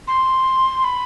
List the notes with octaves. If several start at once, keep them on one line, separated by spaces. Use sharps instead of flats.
C6
B5